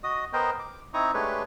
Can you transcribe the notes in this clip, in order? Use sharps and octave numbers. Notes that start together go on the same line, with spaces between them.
F#4 D#5 D#6
B3 A#4 C5 D#5 G5
D6
C4 D#4 E4 A#5 C#6 D#6
G#3 A3 D4 G4 B4 C#5